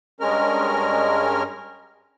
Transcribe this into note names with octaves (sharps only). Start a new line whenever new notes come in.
G2 G#3 C#4 A#4 F6